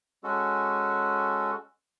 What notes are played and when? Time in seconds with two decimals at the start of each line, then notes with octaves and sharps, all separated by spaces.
0.23 G#3 C#4 F#4 A4